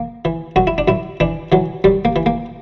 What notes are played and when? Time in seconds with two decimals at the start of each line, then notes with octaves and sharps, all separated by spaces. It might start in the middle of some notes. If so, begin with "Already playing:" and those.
Already playing: A#3
0.25 E3
0.56 F#2 F#4
0.67 E4
0.78 D4
0.88 F#2 E4
1.20 E3 D4
1.52 E3 F#3
1.84 F#2 G3
2.05 A#3
2.16 E3
2.26 A#3